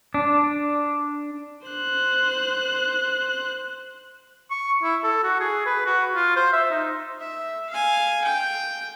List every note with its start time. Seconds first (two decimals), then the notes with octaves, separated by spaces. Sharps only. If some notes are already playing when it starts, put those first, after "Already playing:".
0.14 D4
1.67 C5 F#6
4.51 C#6
4.83 E4
5.04 A4
5.24 F#4
5.40 G#4
5.66 B4
5.86 F#4
6.16 F4
6.36 C5
6.53 E5
6.71 D#4
7.20 E5
7.70 F5 G#5
8.24 G5